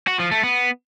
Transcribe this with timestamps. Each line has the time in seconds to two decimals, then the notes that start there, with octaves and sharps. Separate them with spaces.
0.08 F#4
0.20 F3
0.31 A3
0.43 B3